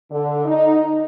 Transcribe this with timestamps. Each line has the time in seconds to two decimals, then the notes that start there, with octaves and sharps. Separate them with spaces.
0.12 D3
0.45 D#4